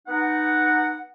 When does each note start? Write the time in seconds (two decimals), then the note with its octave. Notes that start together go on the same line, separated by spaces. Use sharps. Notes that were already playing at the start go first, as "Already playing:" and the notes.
0.07 B3 D#4 F#5